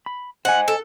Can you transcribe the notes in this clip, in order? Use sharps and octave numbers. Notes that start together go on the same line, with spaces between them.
B5
C5 D#5 F#5 G#5
A4